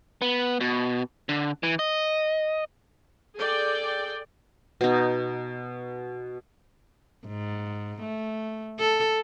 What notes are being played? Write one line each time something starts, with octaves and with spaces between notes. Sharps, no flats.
B3
B2
D3
E3
D#5
G#4 A4 D5 G5
B2 D#4
G#2
A3
A4